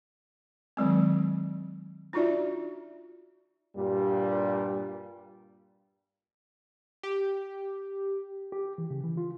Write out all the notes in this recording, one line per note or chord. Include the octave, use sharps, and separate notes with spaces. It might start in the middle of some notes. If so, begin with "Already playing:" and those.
D#3 F#3 G#3 C4
D4 D#4 F4 F#4 D5 E5
G2 A#2 G3
G4
G4
E3
C#3
E3
F4